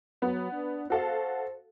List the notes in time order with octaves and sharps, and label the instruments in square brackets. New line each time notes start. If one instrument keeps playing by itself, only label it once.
[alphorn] F#3 [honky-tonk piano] B3
[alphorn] D4
[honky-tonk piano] F#4 A4 F5 [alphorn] C5